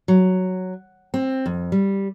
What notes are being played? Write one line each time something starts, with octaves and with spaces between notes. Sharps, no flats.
F#3
C4
F2
G3